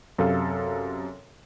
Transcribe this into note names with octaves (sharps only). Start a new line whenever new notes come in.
F#2 C3 A4 F5